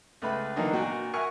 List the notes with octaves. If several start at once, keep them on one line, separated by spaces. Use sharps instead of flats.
C#2 A3 B4 B5
D3 E3 F#3 A#3 D4 D#4
A#2 F#4 G5
A#4 E5 F#5 G#5 C#6